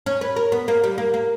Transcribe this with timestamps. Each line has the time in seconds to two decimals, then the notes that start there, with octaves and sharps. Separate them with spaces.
0.06 C#4
0.21 B4
0.36 A#4
0.52 B3
0.68 A#3
0.84 G3
0.98 A#3
1.14 A#3